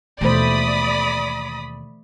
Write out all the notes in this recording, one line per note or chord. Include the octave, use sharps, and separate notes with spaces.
D#2 B2 E3 A3 C5 D5 B5 D#6